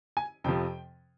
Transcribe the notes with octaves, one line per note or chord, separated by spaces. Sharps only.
G#5
F2 C3 F3 G5